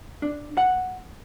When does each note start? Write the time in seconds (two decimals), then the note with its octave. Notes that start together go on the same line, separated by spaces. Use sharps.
0.22 D4
0.57 F#5